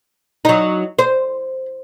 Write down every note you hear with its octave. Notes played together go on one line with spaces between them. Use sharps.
F#3 D#4
C5